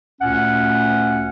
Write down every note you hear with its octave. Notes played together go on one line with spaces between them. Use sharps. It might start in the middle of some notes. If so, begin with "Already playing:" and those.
D2 A#2 C#4 F#5